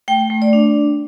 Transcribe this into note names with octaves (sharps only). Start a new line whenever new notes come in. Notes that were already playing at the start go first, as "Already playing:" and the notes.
A3 G5
A3
D5
D4